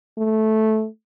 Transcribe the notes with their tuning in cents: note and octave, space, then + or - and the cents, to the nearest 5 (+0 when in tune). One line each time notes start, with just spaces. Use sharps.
A3 -10